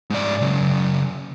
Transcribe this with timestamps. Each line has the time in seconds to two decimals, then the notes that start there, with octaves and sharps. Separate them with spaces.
0.10 G#2 D5
0.41 C#3 F#3